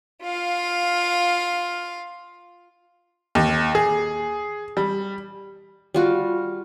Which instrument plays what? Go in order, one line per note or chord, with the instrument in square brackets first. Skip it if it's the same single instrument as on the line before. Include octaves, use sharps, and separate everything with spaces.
[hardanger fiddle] F4 F5
[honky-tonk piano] D#2
G#4
G3
[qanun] G3 F4 F#4